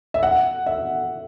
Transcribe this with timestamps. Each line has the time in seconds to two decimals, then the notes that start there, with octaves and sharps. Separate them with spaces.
0.14 E5
0.23 F#5
0.66 E5